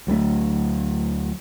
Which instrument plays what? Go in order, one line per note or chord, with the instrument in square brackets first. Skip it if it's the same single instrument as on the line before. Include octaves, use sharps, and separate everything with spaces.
[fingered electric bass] D2 F#3 A3